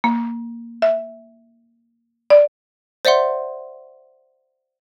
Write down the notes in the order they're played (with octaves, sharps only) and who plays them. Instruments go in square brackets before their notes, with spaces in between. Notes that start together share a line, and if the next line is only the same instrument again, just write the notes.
[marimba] A#3
E5
D5
[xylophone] C5 D5 E5 F#5 C6